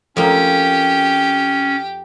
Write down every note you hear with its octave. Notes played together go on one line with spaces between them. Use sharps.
F2 A#3 C#4 G4